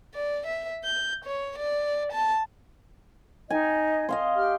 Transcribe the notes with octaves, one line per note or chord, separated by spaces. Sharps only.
D5
E5
G6
C#5
D5
A5
D#4 D#5 G#5
D#5 F5 C6
G4 F6